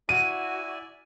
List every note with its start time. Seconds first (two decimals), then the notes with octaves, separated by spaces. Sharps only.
0.09 E4 F#4 D5 G#5 D#7